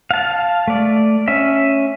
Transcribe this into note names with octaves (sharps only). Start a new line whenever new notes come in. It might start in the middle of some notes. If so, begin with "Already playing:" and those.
F5 A5
A3 D5
C#4 E5